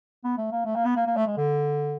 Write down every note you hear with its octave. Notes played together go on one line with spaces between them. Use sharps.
B3
A3
A#3
A3
A#3
B3
A#3
A#3
A3
G#3
D3